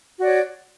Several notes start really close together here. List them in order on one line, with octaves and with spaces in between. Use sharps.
F#4 D5 C#5